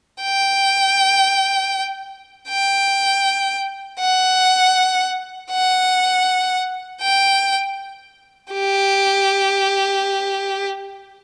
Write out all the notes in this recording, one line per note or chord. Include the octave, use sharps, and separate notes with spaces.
G5
G5
F#5
F#5
G5
G4